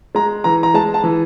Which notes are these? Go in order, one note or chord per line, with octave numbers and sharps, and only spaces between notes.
G#3 A#5
E3 A#5
A#5
G#3 A5
A5
E3